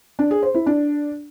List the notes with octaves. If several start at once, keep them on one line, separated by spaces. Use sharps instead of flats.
D4
G#4
C5
E4
D4